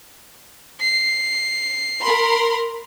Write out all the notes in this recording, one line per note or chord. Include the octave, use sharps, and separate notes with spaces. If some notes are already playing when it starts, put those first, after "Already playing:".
C7
A#4 B5 C6